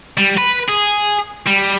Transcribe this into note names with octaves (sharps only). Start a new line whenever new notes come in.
G3
B4
G#4
G3